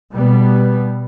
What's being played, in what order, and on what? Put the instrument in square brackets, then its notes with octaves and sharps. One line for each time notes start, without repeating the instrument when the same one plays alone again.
[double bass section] B2 G3 B3